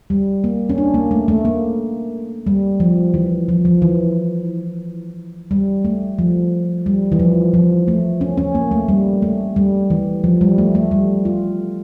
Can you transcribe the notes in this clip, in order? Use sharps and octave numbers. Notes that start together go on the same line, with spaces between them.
G3
A#3
C#4
D4
A#3
A3
A3
A#3
G3
F3
E3
F3
F3
E3
G3
A3
F3
G3
E3
F3
F3
A3
C#4
C#4
A#3
A3
G3
A3
G3
E3
F3
G3
A3
A3
G3
F4